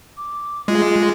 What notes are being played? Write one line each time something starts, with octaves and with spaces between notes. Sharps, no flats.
D6
G#3 F4